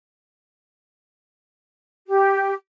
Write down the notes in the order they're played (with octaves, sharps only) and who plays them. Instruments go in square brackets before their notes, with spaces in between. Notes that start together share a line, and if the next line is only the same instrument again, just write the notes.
[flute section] G4